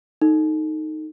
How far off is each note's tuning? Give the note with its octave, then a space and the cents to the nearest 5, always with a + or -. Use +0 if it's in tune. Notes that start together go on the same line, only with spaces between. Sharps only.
D#4 +0 A4 +0